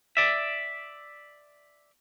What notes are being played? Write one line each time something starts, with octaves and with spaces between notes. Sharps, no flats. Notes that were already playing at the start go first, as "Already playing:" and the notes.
D5 E5